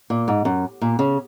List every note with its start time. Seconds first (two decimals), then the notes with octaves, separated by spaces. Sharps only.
0.10 A#2
0.28 G#2
0.45 F#2
0.82 A#2
0.99 C#3